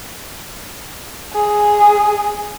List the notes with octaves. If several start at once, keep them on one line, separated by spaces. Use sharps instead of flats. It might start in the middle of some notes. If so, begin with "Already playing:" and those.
G#4